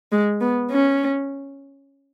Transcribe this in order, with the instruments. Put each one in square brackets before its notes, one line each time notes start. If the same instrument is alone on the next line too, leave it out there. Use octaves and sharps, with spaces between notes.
[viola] G#3
B3
C#4